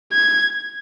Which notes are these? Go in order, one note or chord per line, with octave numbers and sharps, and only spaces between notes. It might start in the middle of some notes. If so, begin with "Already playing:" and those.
G#6